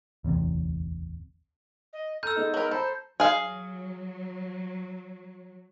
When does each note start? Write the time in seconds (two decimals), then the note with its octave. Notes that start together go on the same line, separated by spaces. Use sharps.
0.24 D1 A1 E2 C3
1.93 D#5
2.23 A4 A#5 E6 F6 G6 D#7
2.36 G#3 B3 D#4
2.54 F#3 A#4 B4
2.71 A4 C5 A#5 B5
3.20 F#3 G#4 F5